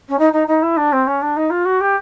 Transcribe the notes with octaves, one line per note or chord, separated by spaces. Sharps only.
C#4
D#4
D#4
D#4
E4
D4
C4
C#4
D4
D#4
F4
F#4
G4